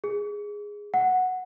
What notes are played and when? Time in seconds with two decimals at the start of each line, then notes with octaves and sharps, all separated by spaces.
0.04 G#4
0.94 F#5